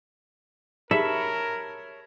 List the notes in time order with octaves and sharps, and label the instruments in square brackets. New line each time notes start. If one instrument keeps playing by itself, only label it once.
[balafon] D#4 G4 G#4 [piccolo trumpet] A#4 [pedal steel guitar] C#5 A5 B5 [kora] E5